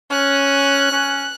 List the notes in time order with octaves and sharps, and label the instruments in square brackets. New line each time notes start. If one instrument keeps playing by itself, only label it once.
[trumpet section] C#4 [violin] F#6
[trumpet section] C#4